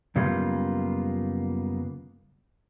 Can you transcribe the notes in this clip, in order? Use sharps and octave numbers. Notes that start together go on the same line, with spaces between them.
F#2 C#3 G3 A#3 B3 F4